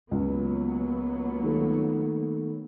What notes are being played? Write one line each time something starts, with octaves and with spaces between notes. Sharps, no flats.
C#2 F#3 A#3 B3
D#3 A3